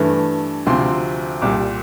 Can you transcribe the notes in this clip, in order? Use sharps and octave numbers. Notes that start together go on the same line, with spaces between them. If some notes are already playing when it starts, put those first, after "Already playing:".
Already playing: G2 E3 A3
D2 C3 F3 C4 C6
C2 A#2 G3 D6